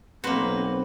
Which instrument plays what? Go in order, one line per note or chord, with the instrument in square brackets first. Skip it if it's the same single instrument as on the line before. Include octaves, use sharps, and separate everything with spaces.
[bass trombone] B1 [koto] A#3 F#4 [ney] C4 [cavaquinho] B4 C5